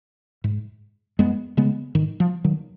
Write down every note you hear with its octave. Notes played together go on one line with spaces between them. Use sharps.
G#2
F#2 G#3 B3
C#3 G#3 B3
G#2 D#3
F3
D#3 F#3